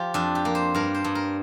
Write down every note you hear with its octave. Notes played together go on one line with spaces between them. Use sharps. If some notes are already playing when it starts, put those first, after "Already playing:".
Already playing: F3 F4 G4
F2 D4
G4
A#3
C5
G2 A#4
C5
G2
A#4